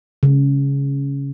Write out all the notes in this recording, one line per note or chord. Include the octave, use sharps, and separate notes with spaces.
C#3